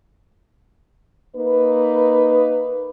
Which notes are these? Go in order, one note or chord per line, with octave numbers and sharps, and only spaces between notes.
A#3 D#4 B4